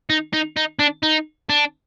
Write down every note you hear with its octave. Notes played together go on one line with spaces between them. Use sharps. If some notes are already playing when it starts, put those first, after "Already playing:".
D#4
D#4
D#4
D4
D#4
D4